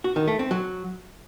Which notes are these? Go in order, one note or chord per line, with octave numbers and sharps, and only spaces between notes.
F#4
D#3
A3
C4
F#3